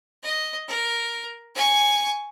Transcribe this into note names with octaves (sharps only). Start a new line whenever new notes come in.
D#5
A#4
G#5 C#6